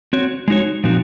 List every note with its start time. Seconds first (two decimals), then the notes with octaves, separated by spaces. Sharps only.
0.13 C4 F#4 C#5
0.48 G#3 D#4 F#4 C#5
0.84 A#2 F3 C4 D#4 F#4